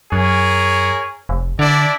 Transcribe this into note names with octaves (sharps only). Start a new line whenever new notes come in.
F#2 G#4 A#4 C#5
F1
D3 D4 E4 D5